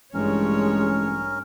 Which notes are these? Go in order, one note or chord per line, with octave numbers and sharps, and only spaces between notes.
A1 G2 G#3 C#4 A#4 C#5